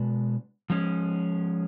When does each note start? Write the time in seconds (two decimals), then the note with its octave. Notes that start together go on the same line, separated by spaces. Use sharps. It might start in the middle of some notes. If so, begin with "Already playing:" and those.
Already playing: B2 G#3 D4 F#4 B4
0.70 F3 G#3 C#4